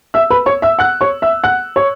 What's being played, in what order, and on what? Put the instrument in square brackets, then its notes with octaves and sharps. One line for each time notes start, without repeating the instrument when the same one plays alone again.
[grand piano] E5 E6
B4 B5
C#5 C#6
E5 E6
F#5 F#6
C#5 C#6
E5 E6
F#5 F#6
C#5 C#6